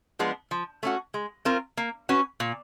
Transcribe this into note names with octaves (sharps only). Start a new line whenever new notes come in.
F3 G#3 B3 D4
F3
A3 C#4 F#4
G#3
C4 F4 A#4
A#3
C#4 F#4 B4
A#2